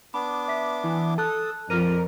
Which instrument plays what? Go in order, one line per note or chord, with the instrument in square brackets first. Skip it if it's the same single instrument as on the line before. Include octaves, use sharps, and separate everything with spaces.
[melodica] B3 D4 D6 [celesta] B5
[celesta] E5 B6
[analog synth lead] E3
[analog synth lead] A4 [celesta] A5 F#6 [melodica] D#6
[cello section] F2 [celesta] F4 F6 D#7 [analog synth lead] A#4 [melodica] D5